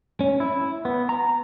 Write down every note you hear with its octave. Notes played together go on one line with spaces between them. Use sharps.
C#4
E4
B3
A#5